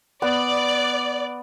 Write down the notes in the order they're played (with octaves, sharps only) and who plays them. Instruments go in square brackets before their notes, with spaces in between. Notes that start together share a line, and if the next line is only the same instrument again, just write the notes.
[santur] B3 [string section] D5